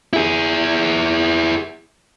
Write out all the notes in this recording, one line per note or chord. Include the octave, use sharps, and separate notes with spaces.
E4 G#4